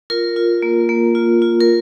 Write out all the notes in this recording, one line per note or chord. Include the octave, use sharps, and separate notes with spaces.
F4 A#4
F4
A#3
A#3
F4
F4
A#4